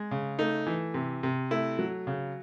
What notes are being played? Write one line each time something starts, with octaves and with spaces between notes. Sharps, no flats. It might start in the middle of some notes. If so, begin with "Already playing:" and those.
Already playing: G#3
C#3
A3 D#4
E3
C3
C3
A3 E4
F#3
C#3